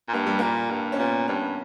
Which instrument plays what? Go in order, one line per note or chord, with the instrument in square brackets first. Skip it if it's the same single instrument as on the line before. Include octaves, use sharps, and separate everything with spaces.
[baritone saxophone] A#2
[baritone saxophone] G2 [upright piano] A#3
[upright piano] G3
[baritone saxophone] A#2 [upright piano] A#3
[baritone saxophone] G2
[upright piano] C#4
[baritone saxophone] A#2 [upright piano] B3
[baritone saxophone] G2 [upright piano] C#4